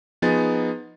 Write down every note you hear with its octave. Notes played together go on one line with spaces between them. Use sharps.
F3 B3 D#4 G#4 A6